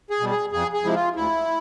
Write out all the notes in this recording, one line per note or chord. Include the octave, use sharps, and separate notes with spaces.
G#4
B2 G3
G#4
F2 G#4
G#4
C3 F3 G#3 E4
F4
D2 E4